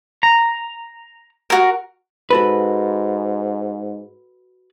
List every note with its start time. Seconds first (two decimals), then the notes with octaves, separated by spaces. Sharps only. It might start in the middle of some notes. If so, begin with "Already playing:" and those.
0.23 A#5
1.50 F#4 A#4
2.30 G#2 F#4 A4 B4